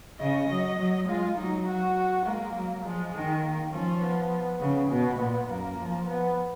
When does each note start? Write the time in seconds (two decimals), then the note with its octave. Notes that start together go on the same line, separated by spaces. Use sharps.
0.20 C#3 D#5
0.50 F#3
0.79 F#3
1.08 G#3 F4
1.37 F#3 D#4
1.66 F#4
2.25 G#3 A#3
2.55 F#3
2.84 F3 G#3
3.14 D#3
3.43 A#3
3.72 F3 C#4
4.02 B3
4.61 C#3
4.89 B2 B3
5.19 A#2
5.48 F#2 A#3
5.78 F3
6.07 B3